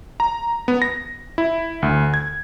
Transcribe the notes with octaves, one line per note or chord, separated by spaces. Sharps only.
A#5
B3
A#6
E4
D2
G#6